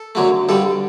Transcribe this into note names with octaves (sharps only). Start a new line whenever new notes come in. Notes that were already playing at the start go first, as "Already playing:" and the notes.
Already playing: A4
F#2 D3 F#3 A3
G2 D3 G3 A4